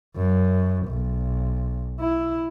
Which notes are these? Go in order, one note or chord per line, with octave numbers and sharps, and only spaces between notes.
F#2
B1
E4